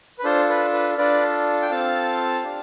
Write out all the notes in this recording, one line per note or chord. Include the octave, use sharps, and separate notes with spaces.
B4
D4 F4 A4 C5
B4
B4
D4 F4 A4 B4 D5
G5
C4 F4 A4 F5 A5
D4 G4